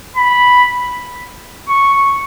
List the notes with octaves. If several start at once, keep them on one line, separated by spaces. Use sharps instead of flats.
B5
C#6